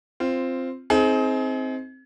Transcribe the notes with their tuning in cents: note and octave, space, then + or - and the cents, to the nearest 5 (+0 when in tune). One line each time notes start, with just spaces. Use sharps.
C4 +0 F4 -10
C4 +0 D#4 +30 G#4 +35